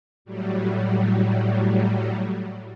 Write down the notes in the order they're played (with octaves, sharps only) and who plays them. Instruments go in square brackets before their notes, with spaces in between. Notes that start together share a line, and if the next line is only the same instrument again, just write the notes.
[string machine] A2 F#3 G3